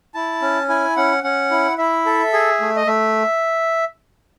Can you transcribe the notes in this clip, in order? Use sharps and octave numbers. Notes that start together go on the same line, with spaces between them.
E4 A5
C#4
E4 G#5
C#4 F#5
C#4 F#5
E4
E4 E5
A4
G#4
A3
D#5
A3 E5